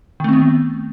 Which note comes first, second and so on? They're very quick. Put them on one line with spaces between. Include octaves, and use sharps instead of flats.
D#3 A3 C4 B3